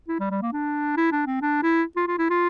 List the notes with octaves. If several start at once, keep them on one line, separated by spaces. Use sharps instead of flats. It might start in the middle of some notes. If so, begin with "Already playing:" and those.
E4
G3
G3
A#3
D4
E4
D4
C4
D4
E4
F4
F4
E4
F4